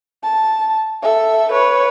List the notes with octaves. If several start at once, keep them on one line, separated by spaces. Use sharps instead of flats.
A5
A4 E5
B4 C#5